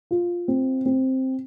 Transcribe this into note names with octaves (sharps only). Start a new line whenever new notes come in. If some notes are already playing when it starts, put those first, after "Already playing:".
F4
C4
C4